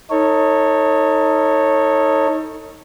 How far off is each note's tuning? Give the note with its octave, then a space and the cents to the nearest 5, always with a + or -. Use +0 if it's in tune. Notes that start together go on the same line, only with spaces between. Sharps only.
D#4 +20 A4 +30 C#5 -10